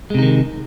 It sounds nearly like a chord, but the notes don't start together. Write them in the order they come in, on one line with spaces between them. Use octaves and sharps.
G#3 C3 D#4 D#3